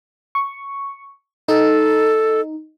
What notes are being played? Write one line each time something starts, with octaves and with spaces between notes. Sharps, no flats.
C#6
D#4 A4